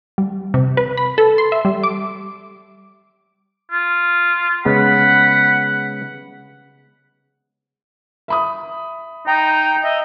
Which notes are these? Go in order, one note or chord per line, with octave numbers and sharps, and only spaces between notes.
G3
C3
B4
B5
A4
C6
E5
G3
D6
F4
C#3 G#3 B3 F#5 B5
E5 B5 D#6
D#4 G5 A#5
D#5 E5